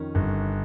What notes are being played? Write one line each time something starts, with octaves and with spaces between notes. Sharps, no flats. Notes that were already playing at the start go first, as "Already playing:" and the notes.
Already playing: F2 D#3 C#4
G1